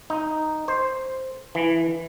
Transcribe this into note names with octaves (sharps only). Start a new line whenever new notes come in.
D#4
C5
E3